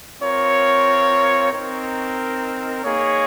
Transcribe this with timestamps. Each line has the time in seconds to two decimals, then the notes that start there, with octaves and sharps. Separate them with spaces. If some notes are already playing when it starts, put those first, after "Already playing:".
0.21 C4 F4 A#4 C#5
1.52 C4 D#4 A#4
2.84 A#3 D#4 G#4 C#5